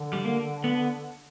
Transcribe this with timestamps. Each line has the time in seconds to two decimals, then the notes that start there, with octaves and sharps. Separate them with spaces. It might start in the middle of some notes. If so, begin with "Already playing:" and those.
Already playing: D3
0.13 G3
0.25 A#3
0.64 B3